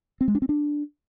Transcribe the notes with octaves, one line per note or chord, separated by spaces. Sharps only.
C4
G#3
D4
C4
D4